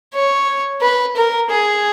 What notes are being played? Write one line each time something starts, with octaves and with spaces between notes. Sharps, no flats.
C#5
B4
A#4
G#4